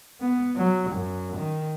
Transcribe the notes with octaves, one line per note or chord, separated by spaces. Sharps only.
B3
F#3
F#2
D#3